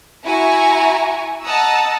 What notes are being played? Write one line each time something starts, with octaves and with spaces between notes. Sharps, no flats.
E4 F#4 E5 G#5 A#5 C#6
D#5 F#5 A5 A#5 D#6 E6